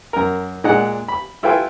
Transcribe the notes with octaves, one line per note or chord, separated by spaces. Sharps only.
F#2 A#4
A#2 G#3 D4 F#5
B5
E4 F4 A4 B4 G5 G#5